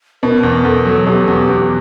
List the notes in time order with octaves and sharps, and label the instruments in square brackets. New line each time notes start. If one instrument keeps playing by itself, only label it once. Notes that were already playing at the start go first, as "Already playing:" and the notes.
[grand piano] B2 [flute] A#4
[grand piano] E2
[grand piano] E2 [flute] A4
[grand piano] F#3
[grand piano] B2 [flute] G4
[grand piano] E2
E2